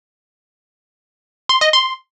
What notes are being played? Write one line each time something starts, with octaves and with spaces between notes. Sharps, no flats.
C6
D#5
C6